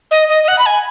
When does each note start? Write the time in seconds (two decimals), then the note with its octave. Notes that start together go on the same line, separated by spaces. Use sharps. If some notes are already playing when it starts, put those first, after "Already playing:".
0.11 D#5
0.29 D#5
0.44 D#5
0.48 F#5
0.59 B5
0.66 G#5